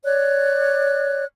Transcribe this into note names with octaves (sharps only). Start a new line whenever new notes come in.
C#5 D5 F#6